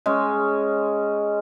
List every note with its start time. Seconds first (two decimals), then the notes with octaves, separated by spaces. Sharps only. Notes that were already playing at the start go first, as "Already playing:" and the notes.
0.06 G#3 C#4